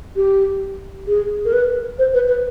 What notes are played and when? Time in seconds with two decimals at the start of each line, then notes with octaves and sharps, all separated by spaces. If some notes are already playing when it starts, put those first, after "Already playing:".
0.16 G4
1.07 G#4
1.45 A#4
1.53 B4
1.99 C5
2.14 B4
2.28 B4